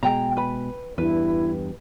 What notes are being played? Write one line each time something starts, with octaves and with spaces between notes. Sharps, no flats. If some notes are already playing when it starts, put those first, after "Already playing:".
B2 G#3 G5 A#5
B4 B5
E2 G2 E4 B4